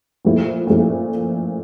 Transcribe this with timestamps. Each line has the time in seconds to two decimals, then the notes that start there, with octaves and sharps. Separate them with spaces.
0.25 A#2 F3 A3 E4
0.67 A#2 F3 A3 E4